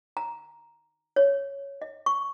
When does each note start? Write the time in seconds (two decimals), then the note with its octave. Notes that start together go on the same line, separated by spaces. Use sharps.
0.17 A#5
1.16 C#5
1.82 D#5
2.06 C#6